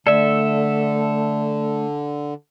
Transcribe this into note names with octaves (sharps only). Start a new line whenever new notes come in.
D3 A3 A4 D5 E5